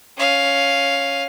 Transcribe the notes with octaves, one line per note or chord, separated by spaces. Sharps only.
C#4 F5